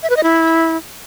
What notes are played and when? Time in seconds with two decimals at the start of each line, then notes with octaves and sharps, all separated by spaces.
0.03 E5
0.10 B4
0.17 D#5
0.23 E4